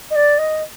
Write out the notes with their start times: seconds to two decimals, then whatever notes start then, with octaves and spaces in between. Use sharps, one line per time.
0.10 D#5
0.15 D5
0.38 D#5